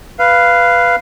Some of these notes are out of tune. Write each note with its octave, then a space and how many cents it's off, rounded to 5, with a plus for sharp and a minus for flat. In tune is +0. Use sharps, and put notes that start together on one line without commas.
B4 +0 F5 -10